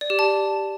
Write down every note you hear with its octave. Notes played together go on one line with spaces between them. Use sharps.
D5
G4
A5